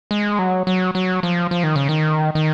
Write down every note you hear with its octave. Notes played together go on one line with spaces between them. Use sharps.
G#3
F#3
F#3
F#3
F3
F3
D#3
C#3
D#3
D#3